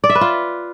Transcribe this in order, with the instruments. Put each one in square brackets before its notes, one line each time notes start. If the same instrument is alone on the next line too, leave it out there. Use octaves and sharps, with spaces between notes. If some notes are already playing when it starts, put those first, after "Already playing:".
[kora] D5
E5
B4
F4